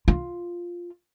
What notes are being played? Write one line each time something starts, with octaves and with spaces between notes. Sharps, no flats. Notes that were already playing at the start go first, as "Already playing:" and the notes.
F4